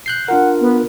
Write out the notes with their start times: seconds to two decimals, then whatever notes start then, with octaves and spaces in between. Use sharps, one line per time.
0.06 F#6 G6 C7
0.28 D4 F4 A#4 F#5
0.60 B3